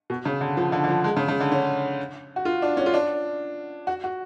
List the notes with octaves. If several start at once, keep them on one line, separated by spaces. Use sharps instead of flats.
B2
C#3
D3
F3
D3
D3
F3
G#3
C#3
C#3
D3
C#4
F#4
F4
D4
C#4
F4
D4
F#4
F#4